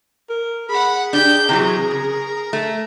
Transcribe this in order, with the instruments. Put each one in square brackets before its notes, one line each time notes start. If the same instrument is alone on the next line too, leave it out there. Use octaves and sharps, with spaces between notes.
[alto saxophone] A#4
[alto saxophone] G#4 [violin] F#5 B5
[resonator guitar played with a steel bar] D4 G4 [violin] G5 G6
[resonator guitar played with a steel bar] C3 E3 F#3 [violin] A#4
[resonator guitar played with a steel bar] C#3
A3